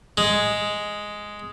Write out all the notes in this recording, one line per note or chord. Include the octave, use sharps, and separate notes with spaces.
G#3